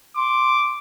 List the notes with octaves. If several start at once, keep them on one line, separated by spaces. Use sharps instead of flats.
C6 D6